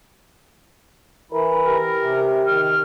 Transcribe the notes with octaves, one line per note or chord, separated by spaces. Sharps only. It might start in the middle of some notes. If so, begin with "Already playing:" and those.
E3 E4 A#4
G4 A#4
C3
D#3 F6